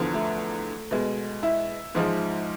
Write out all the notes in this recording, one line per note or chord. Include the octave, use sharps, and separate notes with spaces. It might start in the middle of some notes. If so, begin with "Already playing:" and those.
Already playing: E2 D3 F3
A3
B2 G#3
E4
G#2 F3 G#3